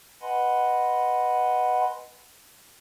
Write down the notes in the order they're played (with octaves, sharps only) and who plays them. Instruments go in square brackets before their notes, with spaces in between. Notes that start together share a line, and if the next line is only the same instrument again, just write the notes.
[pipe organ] B4 D#5 F#5 G#5 B5 C6